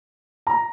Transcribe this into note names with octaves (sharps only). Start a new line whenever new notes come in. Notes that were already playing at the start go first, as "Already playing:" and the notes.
A#5